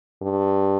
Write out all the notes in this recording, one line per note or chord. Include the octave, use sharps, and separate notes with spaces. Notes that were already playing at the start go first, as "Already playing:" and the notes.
G2